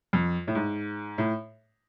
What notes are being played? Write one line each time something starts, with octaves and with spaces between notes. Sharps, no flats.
F2
A2
G#2
A2